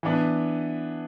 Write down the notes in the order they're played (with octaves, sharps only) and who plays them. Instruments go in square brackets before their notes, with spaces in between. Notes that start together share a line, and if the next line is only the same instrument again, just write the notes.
[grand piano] E3 B3 D4